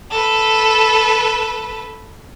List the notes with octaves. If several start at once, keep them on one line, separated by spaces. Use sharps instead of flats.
A4 B4